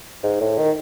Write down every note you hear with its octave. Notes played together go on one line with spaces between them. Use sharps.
G#2
A2
D#3